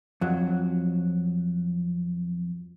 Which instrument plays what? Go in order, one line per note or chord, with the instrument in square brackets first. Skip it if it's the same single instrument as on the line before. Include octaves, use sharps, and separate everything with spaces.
[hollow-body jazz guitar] F2 F#3